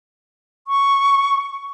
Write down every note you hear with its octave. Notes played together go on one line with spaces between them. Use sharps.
C#6